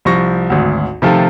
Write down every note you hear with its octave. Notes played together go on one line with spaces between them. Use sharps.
C2 F3 C#6 A#6
G#1 D2
C3 D#3 F3 A3 F4 A4